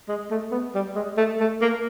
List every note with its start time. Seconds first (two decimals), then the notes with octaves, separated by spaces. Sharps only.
0.09 G#3
0.31 A3
0.52 B3
0.75 G3
0.95 G#3
1.18 A3
1.40 A3
1.62 A#3